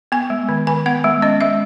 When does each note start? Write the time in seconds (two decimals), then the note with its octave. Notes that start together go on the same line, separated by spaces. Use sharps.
0.12 B3 G#5
0.30 G#3
0.49 D#3
0.67 D#3 G#5
0.86 B3 F#5
1.04 G#3
1.22 C#4 D#5
1.41 G#3 E5